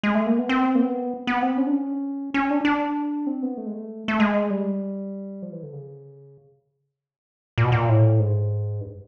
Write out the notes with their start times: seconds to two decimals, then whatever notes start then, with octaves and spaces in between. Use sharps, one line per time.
0.03 G#3
0.15 A3
0.26 A#3
0.38 B3
0.49 C4
0.75 A#3
0.81 B3
1.27 B3
1.43 C4
1.57 C#4
1.67 D4
1.72 C#4
2.34 C#4
2.51 D4
2.65 D4
3.27 C4
3.42 B3
3.58 A3
3.66 G#3
3.74 A3
4.08 A3
4.20 G#3
4.50 G3
5.42 F3
5.52 E3
5.63 D3
5.73 C#3
7.58 A#2
7.64 B2
7.72 A#2
7.89 A2
8.20 G#2
8.81 G2